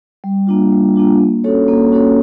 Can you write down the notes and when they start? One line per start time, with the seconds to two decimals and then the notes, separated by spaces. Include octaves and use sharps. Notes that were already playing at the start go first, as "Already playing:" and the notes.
0.24 G3
0.47 A#3 D4 F4
0.72 G3
0.96 A#3 D4 F4
1.19 A#3
1.44 C#4 F#4 A4 C#5
1.68 A#3
1.92 C#4 F#4 A4 C#5